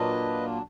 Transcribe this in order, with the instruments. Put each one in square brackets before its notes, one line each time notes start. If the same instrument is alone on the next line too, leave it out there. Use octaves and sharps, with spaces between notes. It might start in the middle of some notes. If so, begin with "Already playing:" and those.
Already playing: [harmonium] A#2 F#3 A#3 D4 F4 B4 D#5